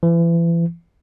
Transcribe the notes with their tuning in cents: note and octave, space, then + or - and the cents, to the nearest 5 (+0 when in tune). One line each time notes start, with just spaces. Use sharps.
E3 +35